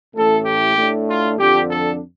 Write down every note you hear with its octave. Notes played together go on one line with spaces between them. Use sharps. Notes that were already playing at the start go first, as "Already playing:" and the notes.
A1 A2 A3 A4
G4
A2 A3 D4
F4
F2 D3 F3 D4 G4
A4